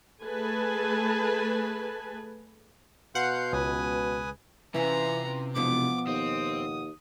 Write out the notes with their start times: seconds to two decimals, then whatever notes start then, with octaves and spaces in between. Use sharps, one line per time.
0.22 A3 G#4 B4 G#5 A5
3.15 B2 F5 F#5 C6 G6
3.53 C#2 B4 G#5 D#6
4.74 C3 E3 C#4 E4 F4 B4 A#5
5.55 E1 B2 F3 B3 D6
6.07 D#2 C4 D#6